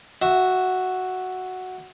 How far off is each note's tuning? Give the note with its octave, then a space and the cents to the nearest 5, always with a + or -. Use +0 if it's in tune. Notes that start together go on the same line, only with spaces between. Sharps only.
F#4 +0 E5 +0